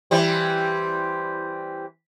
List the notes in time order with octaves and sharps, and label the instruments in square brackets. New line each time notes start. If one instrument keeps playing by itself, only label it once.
[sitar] E3 G3 C4